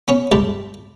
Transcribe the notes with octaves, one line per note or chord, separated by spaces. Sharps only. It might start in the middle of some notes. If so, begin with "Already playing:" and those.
B3 C#4 C#5
C#2 G2 G4 B4 A5